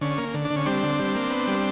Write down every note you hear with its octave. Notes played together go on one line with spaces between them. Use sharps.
D3 C#4
A#3
D3
D4
D3
C#4
G3 C4 D4
D3
G3
A#3
B3
G3